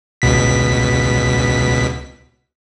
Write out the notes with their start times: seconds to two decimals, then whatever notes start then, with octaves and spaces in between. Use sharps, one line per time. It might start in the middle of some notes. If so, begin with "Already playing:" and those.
0.22 C#2 B2 B6